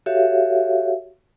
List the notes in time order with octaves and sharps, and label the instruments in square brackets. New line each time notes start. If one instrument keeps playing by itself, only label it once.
[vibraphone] F#4 G4 A4 C#5 E5 F5